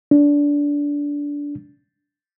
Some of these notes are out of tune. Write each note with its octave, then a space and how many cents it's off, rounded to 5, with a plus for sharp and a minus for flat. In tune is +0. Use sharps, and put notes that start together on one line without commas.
D4 -20